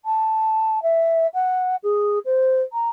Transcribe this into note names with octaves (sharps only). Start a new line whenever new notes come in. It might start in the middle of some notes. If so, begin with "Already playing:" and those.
A5
E5
F#5
G#4
C5
A#5